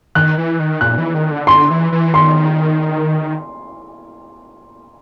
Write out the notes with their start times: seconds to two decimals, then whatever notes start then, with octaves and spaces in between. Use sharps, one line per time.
0.15 D#3 F#6
0.38 E3
0.59 D#3
0.81 A#2 F#6
0.98 E3
1.15 D#3
1.31 D3
1.47 D3 C6
1.70 E3
1.92 E3
2.14 D#3 C6